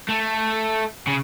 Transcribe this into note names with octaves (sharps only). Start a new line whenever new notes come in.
A3
C#3